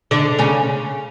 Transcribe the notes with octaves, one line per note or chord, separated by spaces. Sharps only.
D3 D4
C#3 C#4